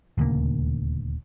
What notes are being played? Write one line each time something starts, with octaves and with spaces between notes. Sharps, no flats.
D#1 D2 C#3 A#3